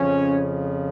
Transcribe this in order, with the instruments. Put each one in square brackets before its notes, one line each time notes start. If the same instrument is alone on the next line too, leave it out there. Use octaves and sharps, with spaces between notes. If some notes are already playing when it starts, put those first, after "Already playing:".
Already playing: [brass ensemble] F2 C#3 F3 C#4